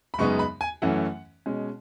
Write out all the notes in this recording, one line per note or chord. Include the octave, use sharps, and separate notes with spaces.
B5
F#2 C#3 G#3 B3 D#4 C#6
B5
G#5
F#2 E3 A3 C#4 F#5
B2 G#3 C#4